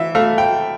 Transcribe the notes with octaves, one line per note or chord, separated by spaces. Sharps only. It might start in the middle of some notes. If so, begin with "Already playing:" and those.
Already playing: E3 E5
A3 F5
G5